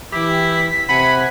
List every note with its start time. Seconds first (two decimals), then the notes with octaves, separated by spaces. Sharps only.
0.12 E3 E4 G4 B6
0.89 C3 F#5 G#5 B5